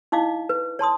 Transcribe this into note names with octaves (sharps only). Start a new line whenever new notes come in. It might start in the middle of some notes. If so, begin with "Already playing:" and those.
D#4 E4 D#5 F5 D6
B4
C#5 A5 C6 D#6